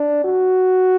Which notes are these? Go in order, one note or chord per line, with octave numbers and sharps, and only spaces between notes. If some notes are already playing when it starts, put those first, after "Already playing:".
Already playing: D4
F#4